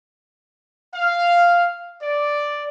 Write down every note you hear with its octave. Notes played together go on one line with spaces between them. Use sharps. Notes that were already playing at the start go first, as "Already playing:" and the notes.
F5
D5